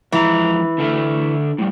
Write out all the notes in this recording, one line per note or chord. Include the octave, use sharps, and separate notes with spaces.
F2 E3 G#3 A#5
D3 A4 E5
A2 G3